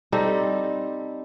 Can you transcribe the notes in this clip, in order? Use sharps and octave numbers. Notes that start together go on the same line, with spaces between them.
G3 C4 D#4 A4